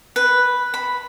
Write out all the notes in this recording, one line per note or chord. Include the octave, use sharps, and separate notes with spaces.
B4
B5